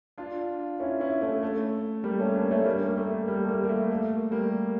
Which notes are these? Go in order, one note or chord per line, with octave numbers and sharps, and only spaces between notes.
D4 F4
C#4 E4
C#4 E4
A3 C#4
A3
G3 A#3
A3 C#4
A#3 D4
A3 C#4
G3 A#3
A#3
A3
G3 A#3
A3
G3 A#3
A#3
A3
A3
G3 A#3